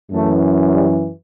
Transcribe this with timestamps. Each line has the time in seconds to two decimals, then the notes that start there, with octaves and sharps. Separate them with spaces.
0.12 F#2 E3 A3
0.73 G3